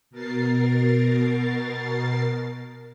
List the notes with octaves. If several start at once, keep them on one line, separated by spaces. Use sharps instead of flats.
B2 A#4 A6 C7